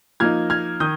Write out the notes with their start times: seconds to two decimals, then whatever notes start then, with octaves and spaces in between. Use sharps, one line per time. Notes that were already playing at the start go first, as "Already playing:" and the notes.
0.20 F3 A#3 D#4 F6 G#6
0.50 F6 G#6
0.80 D#3 D#6 G6